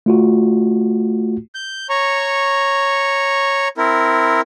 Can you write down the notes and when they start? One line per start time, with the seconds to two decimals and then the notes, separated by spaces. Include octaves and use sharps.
0.06 A3 F4 F#4
1.55 G6
1.89 C#5 A#5 C#6
3.77 C4 E4 A#4